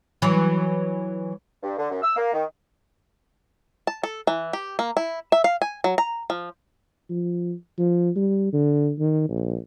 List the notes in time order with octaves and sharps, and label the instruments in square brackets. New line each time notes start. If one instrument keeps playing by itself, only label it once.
[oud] E3 F#3
[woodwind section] G2
D3
F#2
E6
A#3
D#3
[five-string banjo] A5
A4
E3
G4
A#3
E4
E5
F5
G#5
F#3
A#5
F3
[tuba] F3
F3
G3
D3
D#3
A#1